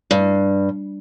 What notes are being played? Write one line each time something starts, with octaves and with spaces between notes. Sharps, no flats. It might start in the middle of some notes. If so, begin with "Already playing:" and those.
G2